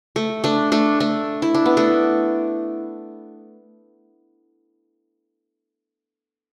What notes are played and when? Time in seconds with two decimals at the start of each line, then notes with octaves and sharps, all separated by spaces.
0.16 A3
0.44 A3 D4
0.72 A3 D4
1.00 A3 D4
1.42 E4
1.54 D4
1.66 B3
1.77 A3 D4